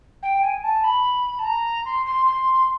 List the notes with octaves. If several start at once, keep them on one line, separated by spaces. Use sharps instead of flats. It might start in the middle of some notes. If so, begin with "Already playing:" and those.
G5
G#5
A5
B5
A5
A#5
C6
C6
C6